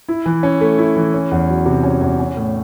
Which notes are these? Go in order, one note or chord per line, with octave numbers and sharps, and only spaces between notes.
E4
E3
C#4
A3
E4
E3
C#4
E2
F#3
C3
C#4
E2
C#4
A2